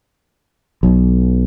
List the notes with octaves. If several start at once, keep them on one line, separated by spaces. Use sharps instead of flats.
B1